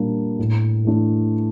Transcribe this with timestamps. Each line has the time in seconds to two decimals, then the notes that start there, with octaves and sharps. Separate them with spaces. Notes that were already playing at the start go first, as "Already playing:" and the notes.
Already playing: A#2 G3 A#3 D4
0.39 A2
0.85 E3 A3 D4